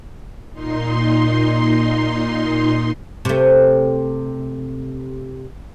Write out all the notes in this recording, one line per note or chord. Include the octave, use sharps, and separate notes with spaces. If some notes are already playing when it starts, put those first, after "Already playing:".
A#2 D#4 C6
C3 A3